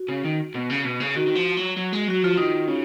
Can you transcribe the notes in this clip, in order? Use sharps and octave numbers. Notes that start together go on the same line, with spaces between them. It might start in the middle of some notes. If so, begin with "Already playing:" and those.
Already playing: F#4
C#3
D#3
B2
C#3
B2
C#3
D#3 F#4
D#3
F3
F#3
F#3
G#3
F#3 F#4
F3 F4
D#3 D#4
C#3